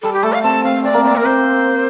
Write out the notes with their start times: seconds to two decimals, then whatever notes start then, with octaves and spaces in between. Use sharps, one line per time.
0.02 G3 A4
0.13 G4
0.23 A3 A4
0.33 F5
0.43 C4 A5
0.64 C4 F5
0.84 C4 D5
0.94 A#3
1.04 C4 D5
1.14 A#3 A#4
1.25 C4 C5